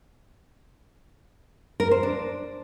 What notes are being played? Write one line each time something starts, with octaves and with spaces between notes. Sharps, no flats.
A#4
C5
D4